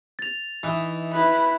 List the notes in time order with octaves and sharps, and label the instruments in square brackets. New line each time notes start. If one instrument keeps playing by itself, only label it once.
[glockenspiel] A6 F7
[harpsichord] E3 D#4
[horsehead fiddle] E4 [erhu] B4